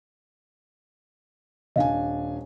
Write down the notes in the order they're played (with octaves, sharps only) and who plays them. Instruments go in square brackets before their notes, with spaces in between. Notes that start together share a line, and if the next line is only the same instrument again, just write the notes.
[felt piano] D#1 D4 G#5 [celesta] D#5 F5